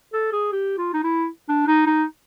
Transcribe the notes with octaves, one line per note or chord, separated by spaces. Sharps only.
A4
G#4
G4
F4
D#4
E4
D4
D#4
D#4